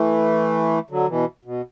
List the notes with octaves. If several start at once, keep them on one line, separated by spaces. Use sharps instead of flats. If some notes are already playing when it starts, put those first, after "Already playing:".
Already playing: E3 A3
D3 F#3
B2 E3
B2